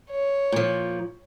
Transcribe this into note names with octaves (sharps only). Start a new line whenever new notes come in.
C#5
A#2 F3